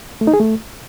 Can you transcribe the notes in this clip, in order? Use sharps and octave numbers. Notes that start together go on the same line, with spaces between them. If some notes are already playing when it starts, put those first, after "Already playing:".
A3
D#4
G#4
A3